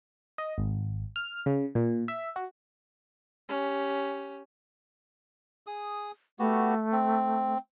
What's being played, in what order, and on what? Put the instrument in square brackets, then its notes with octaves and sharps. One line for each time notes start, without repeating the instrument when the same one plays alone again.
[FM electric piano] D#5
G#1
F6
C#3
A#2
E5
F#4
[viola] C#4 G4
[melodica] G#4 D#6
[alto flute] A3 [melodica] B3 F#4 G4
[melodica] C4